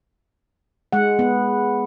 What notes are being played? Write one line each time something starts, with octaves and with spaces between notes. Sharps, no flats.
G#3 F#5
B3